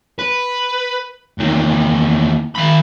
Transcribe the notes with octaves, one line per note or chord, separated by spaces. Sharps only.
B4
E2 D#3
D#3 B5